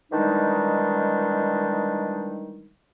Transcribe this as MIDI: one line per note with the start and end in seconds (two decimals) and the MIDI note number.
0.12 2.68 51
0.12 2.68 52
0.12 2.68 55
0.12 2.68 56
0.12 2.68 62
0.12 2.68 63